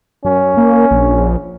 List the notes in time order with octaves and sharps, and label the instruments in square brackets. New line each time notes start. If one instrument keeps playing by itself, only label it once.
[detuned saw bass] F#2 [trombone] C#4
[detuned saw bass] A#3
A#1